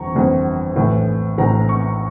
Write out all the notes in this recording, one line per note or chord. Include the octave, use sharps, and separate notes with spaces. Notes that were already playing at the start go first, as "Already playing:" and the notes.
Already playing: G1 F2 E3 A#5 C#6
G1 F2 E3
A#1 A2 E3
A#1 A2 E3 A#5
C#6